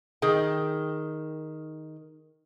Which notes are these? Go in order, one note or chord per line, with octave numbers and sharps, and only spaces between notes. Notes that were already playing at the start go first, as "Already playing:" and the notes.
D#3 G#4 G5